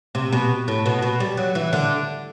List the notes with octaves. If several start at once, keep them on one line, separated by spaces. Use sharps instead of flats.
C3
B2
A2
B2
B2
G3
F#3
E3
D3